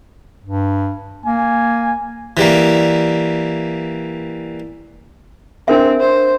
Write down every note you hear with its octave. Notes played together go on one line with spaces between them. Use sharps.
G2
A#3 G#5
E3 G3 A#3
C4 D4 A#4 E5
C5